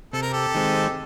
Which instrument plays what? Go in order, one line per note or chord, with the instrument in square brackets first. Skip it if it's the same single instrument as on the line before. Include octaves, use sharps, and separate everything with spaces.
[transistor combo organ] C3 [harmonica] A4
[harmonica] A#4
G4 A4
[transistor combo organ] D#3 G#3 C4